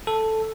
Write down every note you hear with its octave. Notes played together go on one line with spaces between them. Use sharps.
A4